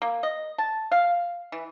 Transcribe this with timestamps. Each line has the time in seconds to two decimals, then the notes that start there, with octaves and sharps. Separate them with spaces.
0.02 A#3
0.23 D#5
0.58 A5
0.91 F5
1.52 E3